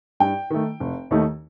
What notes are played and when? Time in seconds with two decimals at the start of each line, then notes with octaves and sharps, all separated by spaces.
0.20 G2 G5
0.50 D#3 A3
0.80 F1
1.11 D#2 D#3 A3 D#4